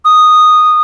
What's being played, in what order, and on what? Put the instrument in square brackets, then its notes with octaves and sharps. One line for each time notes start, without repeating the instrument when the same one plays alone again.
[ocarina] D#6